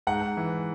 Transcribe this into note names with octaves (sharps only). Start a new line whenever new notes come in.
G#2 F#5
G#2
E3